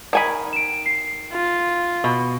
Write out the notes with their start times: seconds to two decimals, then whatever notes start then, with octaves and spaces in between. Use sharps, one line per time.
0.13 D#3 G#5 B5
0.53 D7 E7
0.86 C7
1.32 F4
2.04 B2